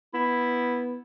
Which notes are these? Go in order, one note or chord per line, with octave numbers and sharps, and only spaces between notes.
B3 E4